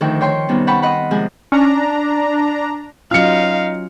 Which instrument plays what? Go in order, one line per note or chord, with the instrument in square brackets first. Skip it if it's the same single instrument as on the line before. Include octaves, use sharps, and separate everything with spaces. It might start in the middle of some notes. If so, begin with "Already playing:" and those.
[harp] D2 D#3 F3 G5 C#6
C#5 G5 C6 C#6
C3 D#3 G3 B3 C#4
F#5 G5 A5 B5 C#6
D#5 F#5 B5 C6
C3 F3 G#3 G#5
[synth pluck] C#4 [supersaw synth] D4 A#5
[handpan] F#3 C#4 F4 [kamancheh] D#4 F5 [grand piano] F6 C#7